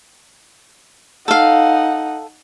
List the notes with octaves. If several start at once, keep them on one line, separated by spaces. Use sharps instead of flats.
D#4 A4 F5 F#5